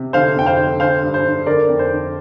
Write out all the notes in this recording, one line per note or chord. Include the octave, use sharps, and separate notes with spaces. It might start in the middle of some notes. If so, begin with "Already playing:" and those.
Already playing: C3
D3 C5 F5
F2 G5
C5 F5
D3
D3 C5 F5
G2
C5
D3
D3 A#4 D5
F2
C5
D3